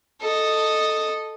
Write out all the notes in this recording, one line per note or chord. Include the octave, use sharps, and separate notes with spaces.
A4 D#5